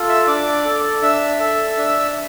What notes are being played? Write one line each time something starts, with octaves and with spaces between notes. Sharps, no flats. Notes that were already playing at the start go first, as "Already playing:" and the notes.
Already playing: F4 A4
E5 E6
D4 D5 D6
A4
D4 E5 E6
A4
D4